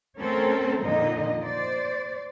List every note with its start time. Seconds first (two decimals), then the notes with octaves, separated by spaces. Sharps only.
0.19 A3 C4 C#4 A4 A#4
0.83 F2 A#2 D3 D#4 D#5
1.43 C5 D5